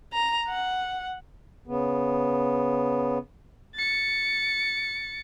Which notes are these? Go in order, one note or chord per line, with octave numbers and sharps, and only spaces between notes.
A#5
F#5
C#3 B3
A6 C#7